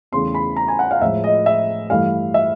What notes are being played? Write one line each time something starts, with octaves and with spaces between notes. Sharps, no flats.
E2 C#3 E3 A3 C6
B5
A#5
G#5
F#5
F5
A2 F3 G#3 E5
D#5
E5
G2 E3 A3 F5
E5